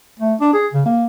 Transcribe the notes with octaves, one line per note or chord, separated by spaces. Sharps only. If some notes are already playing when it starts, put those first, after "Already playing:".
A3
D4
G#4
C#3
A#3